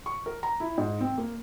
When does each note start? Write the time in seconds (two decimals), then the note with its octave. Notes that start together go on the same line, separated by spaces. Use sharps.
0.06 C#6
0.26 A#4
0.43 A#5
0.60 E4
0.78 G#2
1.01 C4
1.17 A#3